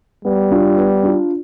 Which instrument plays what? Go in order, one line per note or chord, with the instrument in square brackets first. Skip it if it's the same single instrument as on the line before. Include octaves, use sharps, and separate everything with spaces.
[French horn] G3 [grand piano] B3
[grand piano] D4 F4
B3
D4 F4